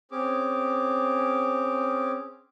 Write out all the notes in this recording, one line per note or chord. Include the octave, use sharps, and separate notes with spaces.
C4 C#4 G#4 D6